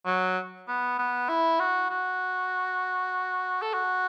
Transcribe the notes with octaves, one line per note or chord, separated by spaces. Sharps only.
F#3
B3
B3
E4
F#4
F#4
A4
F#4